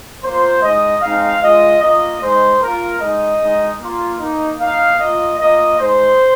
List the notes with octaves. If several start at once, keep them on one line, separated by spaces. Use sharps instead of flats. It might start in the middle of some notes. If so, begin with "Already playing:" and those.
A#3 F4 C5
G#3 D#4 D#5
G#3 C4 D#4 F5
G#3 F4 D#5
A#3 F4 D#5
G#3 D#4 C5
A#3 F4 A#4
G#3 D#4 D#5
G#3 D#4
A#3 F4
A#3 D#4
A#3 D#4 F5
A#3 F4 D#5
A#3 F4 D#5
G#3 D#4 C5